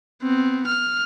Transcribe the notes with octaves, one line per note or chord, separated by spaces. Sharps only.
B3 C4
F6